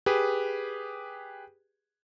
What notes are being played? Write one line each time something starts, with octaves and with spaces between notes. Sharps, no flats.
G4 G#4 B4